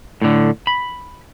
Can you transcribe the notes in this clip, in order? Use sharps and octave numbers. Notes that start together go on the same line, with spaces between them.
A2 D3
B5